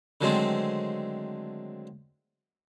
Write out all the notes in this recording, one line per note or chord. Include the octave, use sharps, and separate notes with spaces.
D3 D#3 F#3 G#3 A3 C4